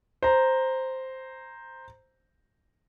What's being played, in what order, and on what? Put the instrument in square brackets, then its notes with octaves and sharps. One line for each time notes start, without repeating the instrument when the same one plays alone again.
[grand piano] C5 A#5